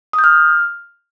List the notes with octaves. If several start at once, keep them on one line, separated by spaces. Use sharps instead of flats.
D#6
G6
F6